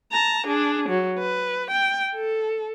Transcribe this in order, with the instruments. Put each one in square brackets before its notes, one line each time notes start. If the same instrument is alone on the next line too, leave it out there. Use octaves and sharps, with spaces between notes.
[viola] A5 A#5
D4 G#4
F#3
B4
G5
A4